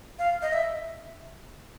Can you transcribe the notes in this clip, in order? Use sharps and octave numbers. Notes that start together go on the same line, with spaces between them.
F5
D#5
E5